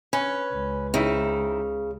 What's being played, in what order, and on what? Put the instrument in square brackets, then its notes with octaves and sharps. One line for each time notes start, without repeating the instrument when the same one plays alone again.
[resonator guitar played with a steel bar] C#4 [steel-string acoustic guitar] B4
[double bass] C#2
[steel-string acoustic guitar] C#3 [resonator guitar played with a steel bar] C4 D#4 E4